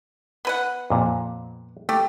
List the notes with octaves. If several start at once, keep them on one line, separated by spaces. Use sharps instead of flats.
B3 B4 F#5
F2 A#2
A3 G4